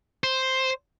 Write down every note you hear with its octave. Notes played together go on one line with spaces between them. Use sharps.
C5